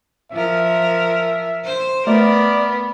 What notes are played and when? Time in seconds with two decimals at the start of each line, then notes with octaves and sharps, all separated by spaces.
0.32 F3 A#4 E5
1.65 C5
2.07 A3 B3 A#4 D5